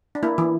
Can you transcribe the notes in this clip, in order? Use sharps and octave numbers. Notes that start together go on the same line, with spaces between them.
D4
A#3 E4
E3